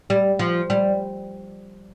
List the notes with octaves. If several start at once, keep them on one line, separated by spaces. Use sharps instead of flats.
G3
F3
G3